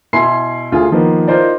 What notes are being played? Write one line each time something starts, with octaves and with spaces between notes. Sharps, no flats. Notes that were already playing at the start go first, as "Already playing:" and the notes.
B2 E4 G#5 C6 C7
D2 F4 G#4
D#3 F3 A#3 B3
D#4 F4 A#4 C5 D5